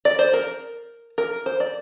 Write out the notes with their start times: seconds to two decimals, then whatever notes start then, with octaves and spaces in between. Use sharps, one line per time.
0.05 D5
0.19 C5
0.33 A#4
1.18 A#4
1.46 C5
1.60 D5